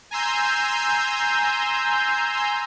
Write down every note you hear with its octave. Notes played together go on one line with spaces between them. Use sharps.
G#5 A#5 C6 E6 G6